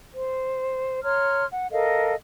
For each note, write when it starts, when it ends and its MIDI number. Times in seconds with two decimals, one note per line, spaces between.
0.14 1.00 72
1.03 1.45 73
1.03 1.45 82
1.03 1.45 84
1.03 1.45 89
1.51 1.67 78
1.71 2.14 69
1.71 2.14 70
1.71 2.14 75
1.71 2.14 77